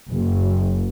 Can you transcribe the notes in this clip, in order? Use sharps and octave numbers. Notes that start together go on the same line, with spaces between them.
F#1